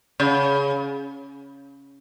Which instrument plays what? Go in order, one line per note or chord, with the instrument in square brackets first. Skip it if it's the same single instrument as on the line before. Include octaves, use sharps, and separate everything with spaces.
[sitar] C#3